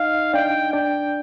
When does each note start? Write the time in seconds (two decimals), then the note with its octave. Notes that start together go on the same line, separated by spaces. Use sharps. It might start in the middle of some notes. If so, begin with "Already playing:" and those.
Already playing: D#4 D#5 F5
0.33 D4 D5 G5
0.73 D4 D5 G5